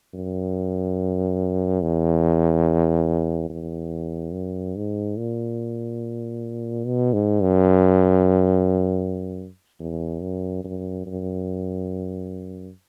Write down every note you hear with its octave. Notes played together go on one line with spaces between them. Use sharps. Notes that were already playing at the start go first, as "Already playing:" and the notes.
F#2
E2
E2
F#2
G#2
A#2
B2
G#2
F#2
E2
F#2
F#2
F#2